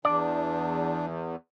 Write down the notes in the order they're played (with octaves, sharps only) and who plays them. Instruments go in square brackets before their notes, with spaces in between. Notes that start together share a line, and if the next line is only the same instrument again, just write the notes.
[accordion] E2 [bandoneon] D4 [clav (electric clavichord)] D5